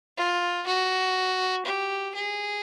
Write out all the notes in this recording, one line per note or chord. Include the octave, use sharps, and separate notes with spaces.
F4
F#4
G4
G#4